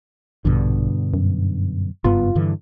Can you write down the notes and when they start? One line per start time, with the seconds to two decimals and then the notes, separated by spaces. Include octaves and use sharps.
0.45 A#1 G2 B2 D3
1.14 F#2
2.04 F#1 G2 B3 F4
2.35 G2 D3 E3